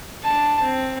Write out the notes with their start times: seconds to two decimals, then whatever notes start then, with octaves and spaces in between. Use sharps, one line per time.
0.23 D4 A5
0.63 C4